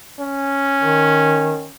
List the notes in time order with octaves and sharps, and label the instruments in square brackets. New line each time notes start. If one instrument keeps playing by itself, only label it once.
[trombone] C#4
[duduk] D#3